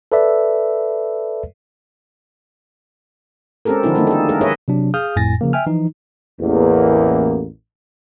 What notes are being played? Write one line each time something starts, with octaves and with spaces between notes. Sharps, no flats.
A4 B4 D5 E5
G#3 C4 C#4 G4 A4 A#4
D3 F3 C4 D4 E4 F#4
D#3 G3 A3 A#3 C4 D#4
G#4 A4
G#3 G#4 A#4 B4
G#4 A4 B4 C#5 D#5 E5
C3 F#3 D4
G#4 F5 D#6 F6 G6
G1 F2 A2 G#5 A6 A#6
C#3 F3 A#3
E5 G5 G#5 F6
E3 F3 D#4
A1 E2 A#3